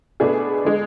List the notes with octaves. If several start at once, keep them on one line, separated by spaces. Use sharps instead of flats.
B2 A3 D4 G#4
D3 G#3